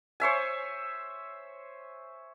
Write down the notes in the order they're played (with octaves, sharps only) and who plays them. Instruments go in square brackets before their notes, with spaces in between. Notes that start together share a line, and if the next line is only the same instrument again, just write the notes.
[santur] C5 C#5 E5 G#5